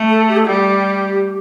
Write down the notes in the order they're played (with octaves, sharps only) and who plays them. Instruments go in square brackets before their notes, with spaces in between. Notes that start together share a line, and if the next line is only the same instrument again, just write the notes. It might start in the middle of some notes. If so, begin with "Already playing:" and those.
Already playing: [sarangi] A3
[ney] A4
G4
A4
[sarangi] G3 [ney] G4